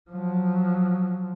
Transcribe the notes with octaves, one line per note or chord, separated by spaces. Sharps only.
F3 F#3